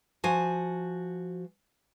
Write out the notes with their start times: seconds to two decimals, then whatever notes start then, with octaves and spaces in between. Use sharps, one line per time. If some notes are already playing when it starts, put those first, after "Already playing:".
0.24 F3 F#4 G#5